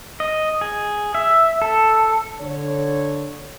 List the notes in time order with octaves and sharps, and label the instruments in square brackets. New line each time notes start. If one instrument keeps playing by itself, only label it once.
[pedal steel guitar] D#5
G#4
E5
A4
[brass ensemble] D3 C#5